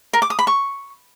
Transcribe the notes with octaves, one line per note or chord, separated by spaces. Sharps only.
A#4
D6
D#6
B5
C#6